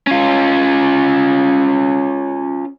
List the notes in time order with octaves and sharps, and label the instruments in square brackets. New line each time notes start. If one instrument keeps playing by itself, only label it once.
[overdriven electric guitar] C#4 F4